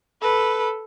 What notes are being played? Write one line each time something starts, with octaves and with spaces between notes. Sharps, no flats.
A4 B4